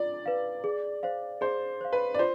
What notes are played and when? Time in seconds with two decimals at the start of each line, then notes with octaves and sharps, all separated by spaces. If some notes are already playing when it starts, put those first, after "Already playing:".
Already playing: F4 D5
0.26 B4 F5
0.64 G#4
1.03 C5 F5
1.41 G#4 C5
1.81 C5 F5
1.93 B4
2.14 D5
2.19 F4 C5